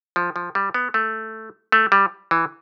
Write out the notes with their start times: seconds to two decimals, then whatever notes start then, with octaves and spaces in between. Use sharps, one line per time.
0.16 F3
0.36 F3
0.55 G3
0.74 B3
0.94 A3
1.72 A3
1.92 G3
2.31 E3